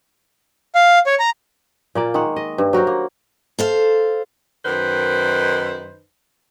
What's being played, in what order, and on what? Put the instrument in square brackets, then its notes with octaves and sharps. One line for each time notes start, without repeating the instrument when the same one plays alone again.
[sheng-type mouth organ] F5
C#5
A#5
[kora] A#2 A#3 D5
D#3 G#3 F#5
D#5
G2
F#3 F#4 A#4 C5
A#3
[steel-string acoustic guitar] A4 C5 F5
[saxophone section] F#2 D#3 D#4 B4 C5